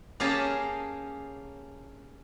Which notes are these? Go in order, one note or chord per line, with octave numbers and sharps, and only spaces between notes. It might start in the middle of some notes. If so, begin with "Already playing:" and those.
A#3 C#4 G4 G#4 A5